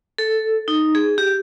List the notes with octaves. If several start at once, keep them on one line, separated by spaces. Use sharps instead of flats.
A4
D#4
G#4
G4